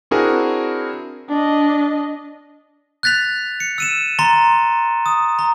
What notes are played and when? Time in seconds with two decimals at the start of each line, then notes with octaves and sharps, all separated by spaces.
0.11 C4 D4 E4 F#4 G#4 A#4
1.29 D4 D#5
3.03 F#6 G6 A6 B6 F7
3.60 C#7
3.78 E6 D#7 E7
4.19 A#5 C6 A6 G7
5.06 D#6
5.39 A#5